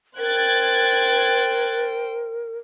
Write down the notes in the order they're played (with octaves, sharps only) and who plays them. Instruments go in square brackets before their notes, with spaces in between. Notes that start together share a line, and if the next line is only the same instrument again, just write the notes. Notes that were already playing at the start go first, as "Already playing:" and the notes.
[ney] A#4 [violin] C5 G5 [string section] F#6 G#6 A6